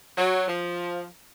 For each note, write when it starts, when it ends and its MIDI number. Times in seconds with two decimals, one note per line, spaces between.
0.17 0.48 54
0.48 1.02 53